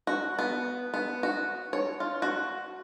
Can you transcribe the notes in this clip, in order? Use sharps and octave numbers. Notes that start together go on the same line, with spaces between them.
F#4
B3
B3
F#4
C#5
F4
F#4